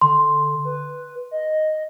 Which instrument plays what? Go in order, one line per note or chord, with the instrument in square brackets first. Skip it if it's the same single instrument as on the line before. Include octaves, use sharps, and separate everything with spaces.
[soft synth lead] D3 [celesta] C6
[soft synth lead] B4
D#5